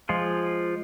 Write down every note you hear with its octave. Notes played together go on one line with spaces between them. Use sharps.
F3 G#3 F4